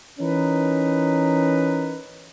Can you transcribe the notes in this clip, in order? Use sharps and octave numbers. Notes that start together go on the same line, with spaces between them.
E3 C#4 D#4 A#4 B4